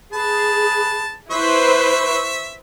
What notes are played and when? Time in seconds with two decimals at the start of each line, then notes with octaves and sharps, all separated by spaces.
0.13 G#4 B4 A5
1.31 E4 B4 C5 E5 C#6